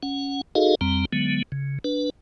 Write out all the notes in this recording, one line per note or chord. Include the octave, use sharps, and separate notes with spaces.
C#4 F#5
D#4 F#4 G#4 A4 D#5 F5
F2 G3 C4 A#5
D3 F#3 G#3 B3
C#3
D4 B4